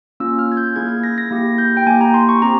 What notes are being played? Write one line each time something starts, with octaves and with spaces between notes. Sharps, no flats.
A#3 C#4 F4 E6
F6
G#6
G6
A#3 E4 G#4 G#6
G#6
A#6
A#6
A#3 E4 G4
G6
G5
A#3 E4 G4 G#5
A#5
C6
C#6
C4 E4 G4 A#5